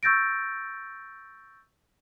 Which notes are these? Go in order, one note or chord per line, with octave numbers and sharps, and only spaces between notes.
C#6 E6 G6 A6 A#6 D7